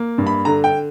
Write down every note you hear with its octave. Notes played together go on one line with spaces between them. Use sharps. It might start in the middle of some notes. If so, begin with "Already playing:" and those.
Already playing: A#3
G2
B5
D3 A#5
G5